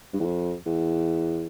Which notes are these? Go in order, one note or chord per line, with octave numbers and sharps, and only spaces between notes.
G2
E2
F2
E2